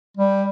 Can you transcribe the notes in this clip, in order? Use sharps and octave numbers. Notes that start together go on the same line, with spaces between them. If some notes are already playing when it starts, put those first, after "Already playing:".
G3